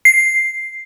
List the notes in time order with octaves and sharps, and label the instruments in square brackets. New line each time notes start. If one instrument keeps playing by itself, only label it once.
[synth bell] C7